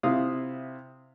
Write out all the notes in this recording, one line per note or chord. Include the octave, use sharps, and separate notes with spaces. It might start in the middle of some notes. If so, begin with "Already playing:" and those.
C3 E4 F4 F5 D#6